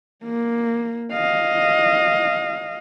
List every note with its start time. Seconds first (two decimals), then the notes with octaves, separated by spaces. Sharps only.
0.24 A#3
1.12 D#5 F5